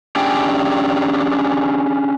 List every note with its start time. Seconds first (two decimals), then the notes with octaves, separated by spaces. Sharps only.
0.16 C#4 D4 G4 G#4 G5